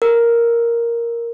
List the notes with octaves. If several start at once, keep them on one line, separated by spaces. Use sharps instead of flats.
A#4